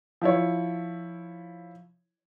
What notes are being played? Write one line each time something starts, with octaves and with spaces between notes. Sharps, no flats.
F3 E4 C#5